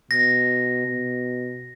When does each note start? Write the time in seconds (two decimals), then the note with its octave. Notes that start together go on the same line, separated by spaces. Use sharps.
0.11 B2 A#6
0.86 B2